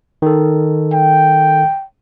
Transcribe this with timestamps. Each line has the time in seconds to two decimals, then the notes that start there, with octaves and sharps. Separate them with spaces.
0.22 D#3 A4
0.94 G5